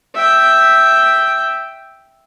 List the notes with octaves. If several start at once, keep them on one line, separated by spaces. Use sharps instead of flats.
E5 G5